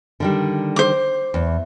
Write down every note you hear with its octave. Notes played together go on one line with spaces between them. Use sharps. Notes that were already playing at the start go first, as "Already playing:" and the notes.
D3 D#3 G3
C5 D6
E2